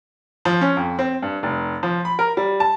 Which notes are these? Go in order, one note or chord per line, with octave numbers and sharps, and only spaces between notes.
F3
C#4
F2
C4
G2
F1
F3
B5
A#4
G3
A5